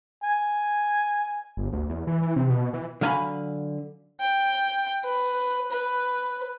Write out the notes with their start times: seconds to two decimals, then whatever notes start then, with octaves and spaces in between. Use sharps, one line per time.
0.23 G#5
1.57 G1
1.73 D2
1.90 E2
2.07 E3
2.22 E3
2.36 C3
2.50 B2
2.73 E3
3.01 D3 F#3 F5 G#5 A#5 B5
4.20 G5
5.04 B4
5.71 B4